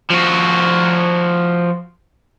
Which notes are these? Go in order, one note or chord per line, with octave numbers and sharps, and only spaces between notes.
F3 F#4